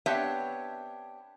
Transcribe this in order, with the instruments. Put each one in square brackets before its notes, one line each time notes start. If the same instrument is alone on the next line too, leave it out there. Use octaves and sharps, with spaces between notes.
[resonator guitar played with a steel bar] B3 C4 D4 G4 C#5 E5